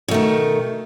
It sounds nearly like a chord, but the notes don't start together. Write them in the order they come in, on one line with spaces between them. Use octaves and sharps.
B2 A3 D#3